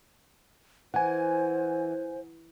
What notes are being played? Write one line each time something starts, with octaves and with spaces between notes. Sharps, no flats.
E3 C5 F#5 G#5